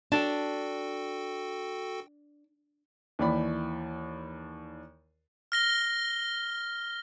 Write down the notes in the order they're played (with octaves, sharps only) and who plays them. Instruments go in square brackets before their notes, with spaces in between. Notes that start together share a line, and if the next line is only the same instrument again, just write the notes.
[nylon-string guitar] D4 [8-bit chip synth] F#4 A4 G5 [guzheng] A5
[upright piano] D#2 E3 D5 B5
[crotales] F6 A#6 G7